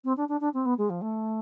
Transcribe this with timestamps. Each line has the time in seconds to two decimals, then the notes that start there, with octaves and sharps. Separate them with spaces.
0.04 C4
0.17 D4
0.28 D4
0.40 D4
0.54 C4
0.65 B3
0.78 G#3
0.89 F3
1.01 A3